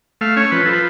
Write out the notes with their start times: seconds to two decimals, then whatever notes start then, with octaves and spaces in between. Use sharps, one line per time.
0.21 A3 F5
0.37 C#4 C#5
0.52 F3 B4
0.65 F3 A4
0.73 B4